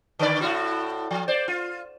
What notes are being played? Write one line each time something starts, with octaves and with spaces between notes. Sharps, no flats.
D3 B4 D5
A2 E4 F#4
F3
C5 D5
F4